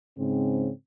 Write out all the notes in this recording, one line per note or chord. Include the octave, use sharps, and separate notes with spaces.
G#2 C#3 C4